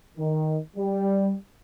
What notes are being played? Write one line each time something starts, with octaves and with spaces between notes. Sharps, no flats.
D#3
G3